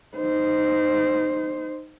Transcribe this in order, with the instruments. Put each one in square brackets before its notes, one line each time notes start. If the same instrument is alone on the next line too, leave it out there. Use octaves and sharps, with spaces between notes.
[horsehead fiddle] D#4 C5